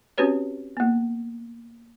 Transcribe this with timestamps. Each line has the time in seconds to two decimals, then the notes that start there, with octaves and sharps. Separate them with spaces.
0.18 C4 C#4 F#4 G4 B4 C#5
0.77 A#3 B3